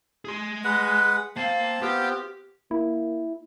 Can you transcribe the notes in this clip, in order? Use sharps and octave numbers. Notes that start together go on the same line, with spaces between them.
G#4 C6
G#3 B4 F#5
A#3 C4 F5 A5
B3 C4 F4 G4
A#3 E4